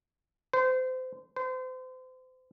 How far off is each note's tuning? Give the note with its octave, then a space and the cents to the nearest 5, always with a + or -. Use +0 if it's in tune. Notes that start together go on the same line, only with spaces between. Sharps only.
C5 -30
C5 -35